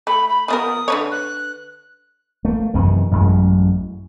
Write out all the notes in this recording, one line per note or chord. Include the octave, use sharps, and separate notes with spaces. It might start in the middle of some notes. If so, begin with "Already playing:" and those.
A3 B5
B5
F3 B3 A#4 D#6
D3 B4 C#5
F#6
A3 A#3
F#2 C3 D#3 E3
A1 F#2 F#3 G#3